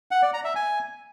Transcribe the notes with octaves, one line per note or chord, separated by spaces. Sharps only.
F#5
D5
A#5
E5
G#5